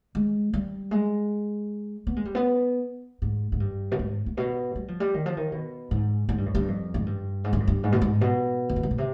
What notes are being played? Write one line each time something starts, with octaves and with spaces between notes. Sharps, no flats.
G#3
G3
G#3
B3
G#3
G3
B3
G#2
G#2
G2
B2
G#2
G#2
B2
G3
F3
G3
D#3
F3
D#3
B2
G#2
G#2
G2
F2
G2
F2
G#2
G2
G#2
G2
F2
G2
G#2
B2
G#2
B2
F2
G2
G#2
B2
C3